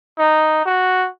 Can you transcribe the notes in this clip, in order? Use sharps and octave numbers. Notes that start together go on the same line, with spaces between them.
D#4
F#4